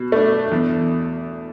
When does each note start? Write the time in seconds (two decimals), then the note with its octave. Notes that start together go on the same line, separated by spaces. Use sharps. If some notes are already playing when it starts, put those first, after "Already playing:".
Already playing: B2
0.12 A3 D4
0.52 E2